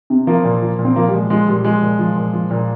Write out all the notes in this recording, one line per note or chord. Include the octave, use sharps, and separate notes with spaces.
C3
F3 A#3
A#2
F3
A#2
C4
F3 A#3
G3
A#2 G#3
F3 G#3
A#2 G3
F3 G#3
A#2
F3
A#2
F3
A#2